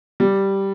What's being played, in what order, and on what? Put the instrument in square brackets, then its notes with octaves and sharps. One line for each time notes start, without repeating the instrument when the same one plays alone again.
[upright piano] G3